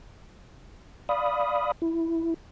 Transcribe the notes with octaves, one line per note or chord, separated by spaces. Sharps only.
D5 F5 B5 D#6
E4